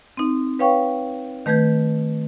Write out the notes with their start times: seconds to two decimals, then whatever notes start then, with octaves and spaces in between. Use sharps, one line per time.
0.17 C4 D#4
0.59 B4 C#5 F5 G5 C#6
1.46 D#3 A3 B4 G6 G#6